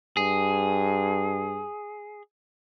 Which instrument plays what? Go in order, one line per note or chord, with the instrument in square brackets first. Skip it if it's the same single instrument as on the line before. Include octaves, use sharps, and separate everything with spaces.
[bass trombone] G2 [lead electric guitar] G#4